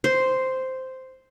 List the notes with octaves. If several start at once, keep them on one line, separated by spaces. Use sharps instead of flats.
C5